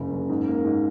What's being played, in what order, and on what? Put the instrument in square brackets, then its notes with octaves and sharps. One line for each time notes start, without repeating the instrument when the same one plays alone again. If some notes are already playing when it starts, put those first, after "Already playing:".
Already playing: [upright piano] F#1 C#3
F#1
G#2
A#3
G#2